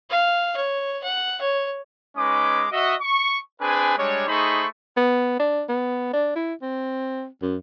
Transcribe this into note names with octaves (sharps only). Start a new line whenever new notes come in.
F5
C#5
F#5
C#5
G#3 C#4 D#4 B4 D6
F#4 D#5 E5
C#6
C4 D4 G#4 B4 G#5
G3 G#3 D4 C#5
A3 D#4 G#4 C5 B5 C#6
B3
D4
B3
D4
E4
C4
F#2